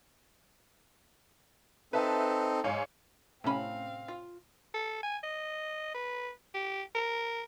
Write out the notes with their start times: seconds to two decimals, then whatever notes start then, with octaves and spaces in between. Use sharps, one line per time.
1.93 C4 D#4 A4 B4 E5 A5
2.64 G#2 C#5 F5
3.44 A2 C3 A3 C4 C#4 F5 B5
4.08 F4
4.74 A4
5.03 G#5
5.23 D#5
5.95 B4
6.54 G4
6.95 A#4